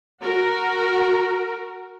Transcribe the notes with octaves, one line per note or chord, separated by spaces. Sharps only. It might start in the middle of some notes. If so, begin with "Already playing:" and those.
F#4 A#4